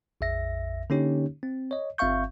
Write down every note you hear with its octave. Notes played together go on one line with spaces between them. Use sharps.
A#1 F2 E5 A#6
D3 A#3 C#4 D#4 G4 C#5
C4
C#5 D#5
G1 C4 E5 F5 C#6 G6